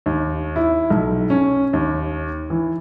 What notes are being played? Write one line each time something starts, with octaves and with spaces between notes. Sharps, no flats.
D#2
E4
B1
C#4
D#2
E3